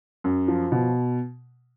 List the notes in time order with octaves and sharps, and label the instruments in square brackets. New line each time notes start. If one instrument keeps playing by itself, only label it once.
[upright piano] F#2
F3
B2